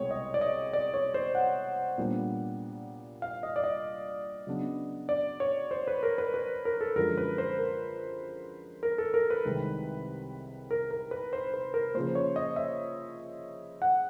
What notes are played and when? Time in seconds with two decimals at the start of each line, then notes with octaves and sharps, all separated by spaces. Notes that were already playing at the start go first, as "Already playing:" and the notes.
Already playing: C2 B2 G#3 C4 C#5
0.11 D#5
0.34 D5
0.41 D#5
0.73 D5
0.94 C#5
1.14 C5
1.35 F#5
1.98 A#2 G3 B3 D4
3.22 F5
3.43 D#5
3.56 D5
3.64 D#5
4.47 C#3 F#3 B3 D4
5.09 D5
5.40 C#5
5.71 C5
5.87 B4
6.03 A#4
6.18 B4
6.34 B4
6.65 A#4
6.81 A4
6.96 F#2 D3 F3 G#3 A#4
7.18 B4
7.38 C5
7.58 A#4
8.83 A#4
8.98 A4
9.14 A#4
9.30 B4
9.45 C2 C3 D#3 G#3 C4
10.71 A#4
10.91 A#4
11.11 B4
11.33 C5
11.54 B4
11.74 A#4
11.95 C#3 F3 A#3 C5
12.15 C#5
12.36 D#5
12.56 E5
13.82 F#5